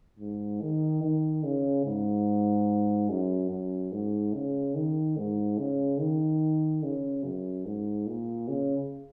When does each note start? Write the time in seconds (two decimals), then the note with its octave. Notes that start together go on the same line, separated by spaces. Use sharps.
0.19 G#2
0.61 D#3
1.03 D#3
1.44 C#3
1.85 G#2
3.09 F#2
3.51 F#2
3.92 G#2
4.34 C#3
4.75 D#3
5.17 G#2
5.58 C#3
6.00 D#3
6.83 C#3
7.24 F#2
7.66 G#2
8.07 A#2
8.48 C#3